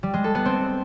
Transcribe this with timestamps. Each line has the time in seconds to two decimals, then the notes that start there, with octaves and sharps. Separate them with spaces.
0.03 G3
0.14 G#3
0.24 A4
0.35 B3
0.45 C4